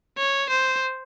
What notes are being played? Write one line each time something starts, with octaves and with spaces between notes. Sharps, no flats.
C#5
C5